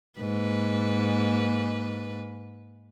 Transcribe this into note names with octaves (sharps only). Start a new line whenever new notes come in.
G#2 A#3 B4